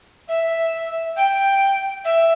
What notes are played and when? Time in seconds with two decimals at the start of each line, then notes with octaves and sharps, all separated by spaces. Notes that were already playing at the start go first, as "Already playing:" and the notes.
0.28 E5
1.16 G5
2.04 E5